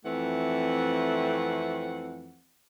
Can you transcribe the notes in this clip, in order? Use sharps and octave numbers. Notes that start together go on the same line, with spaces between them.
F2 E3 A3 C4 F#5